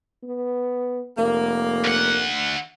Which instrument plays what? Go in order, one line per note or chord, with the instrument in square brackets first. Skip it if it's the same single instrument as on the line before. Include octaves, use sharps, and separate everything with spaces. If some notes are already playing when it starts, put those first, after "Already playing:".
[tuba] B3
[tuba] F1 [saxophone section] A#3
[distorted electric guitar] D2 F#5